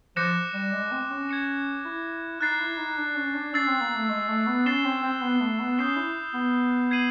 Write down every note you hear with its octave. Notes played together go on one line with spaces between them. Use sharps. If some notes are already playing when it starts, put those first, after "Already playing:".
F3 D6 F#6 A#6 C#7 E7
G3
G#3
C4
C#4
G#6 C#7 E7
E4
D#4 F#6 A6 C7
E4
D#4
D4
C#4
D4
C#4 E6 A6 C7
C4
A#3
A3
G#3
A3
B3
C#4 A6 C7 E7 G7
C4
C4
B3
A3
B3
C#4 D#6 G6 C7 E7 G7
E4
B3
G#6 C7 D#7 F#7